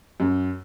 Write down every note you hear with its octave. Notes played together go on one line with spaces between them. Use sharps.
F#2